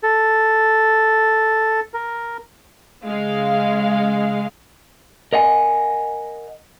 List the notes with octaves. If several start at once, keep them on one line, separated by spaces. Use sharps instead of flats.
A4
A#4
C#3 G#3 F5
A#4 D#5 F#5 G#5